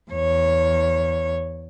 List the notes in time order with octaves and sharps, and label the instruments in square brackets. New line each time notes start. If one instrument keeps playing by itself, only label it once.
[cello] E2 C#5